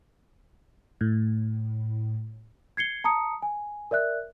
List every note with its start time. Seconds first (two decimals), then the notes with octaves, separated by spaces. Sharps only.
1.01 A2
2.77 G#6 C7 C#7 G7
3.04 A5 A#5 D#6 C#7
3.42 G#5
3.91 A#4 D5 E5 F#6